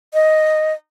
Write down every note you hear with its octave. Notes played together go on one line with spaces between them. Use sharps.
D#5